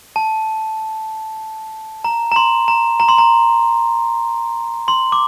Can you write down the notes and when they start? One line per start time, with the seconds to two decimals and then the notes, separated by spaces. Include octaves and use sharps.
0.16 A5
2.04 A#5
2.32 A#5
2.36 C6
2.68 A#5
3.00 A#5
3.09 C6
3.18 A#5
4.88 C6
5.12 D6